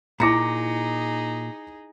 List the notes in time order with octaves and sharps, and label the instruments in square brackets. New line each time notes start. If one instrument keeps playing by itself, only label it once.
[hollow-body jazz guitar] A#2 [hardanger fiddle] D#4 G#4 [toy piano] E4 A#5 [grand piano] D6 A#6 C#7